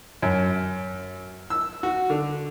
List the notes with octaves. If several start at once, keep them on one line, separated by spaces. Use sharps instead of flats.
F#2
E6
F#4
D3